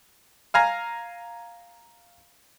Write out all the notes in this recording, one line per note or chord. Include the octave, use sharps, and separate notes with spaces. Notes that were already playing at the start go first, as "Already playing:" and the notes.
F5 G#5 A#5